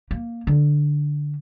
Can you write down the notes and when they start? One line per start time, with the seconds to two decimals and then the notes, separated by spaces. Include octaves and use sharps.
0.11 A#3
0.47 D3